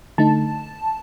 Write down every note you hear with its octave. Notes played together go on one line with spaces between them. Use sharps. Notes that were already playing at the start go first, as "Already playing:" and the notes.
D3 A3 D#4 A5